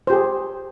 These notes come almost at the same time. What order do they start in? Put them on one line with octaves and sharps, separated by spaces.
C5 G4 G#4